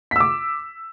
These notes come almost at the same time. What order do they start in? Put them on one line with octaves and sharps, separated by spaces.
B6 E6 D6